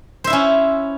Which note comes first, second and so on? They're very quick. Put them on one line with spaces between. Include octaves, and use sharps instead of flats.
C5 E5 E4 C#4